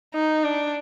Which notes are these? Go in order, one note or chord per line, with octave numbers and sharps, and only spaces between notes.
D#4
D4